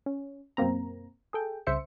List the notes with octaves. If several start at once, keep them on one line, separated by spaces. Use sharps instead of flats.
C#4
F#2 B2 A#3 C4 A#5
G#4 A4 G5
C2 C#3 C5 E5 C#7